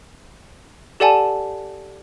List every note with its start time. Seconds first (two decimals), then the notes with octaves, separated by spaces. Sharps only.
1.00 G4 A4 D5 F#5 G#5 A5